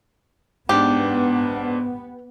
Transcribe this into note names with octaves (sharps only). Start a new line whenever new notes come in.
G#2 B3 D4 G4